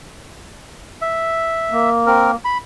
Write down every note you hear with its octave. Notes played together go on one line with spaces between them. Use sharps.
E5
A#3
C4 A#4
B5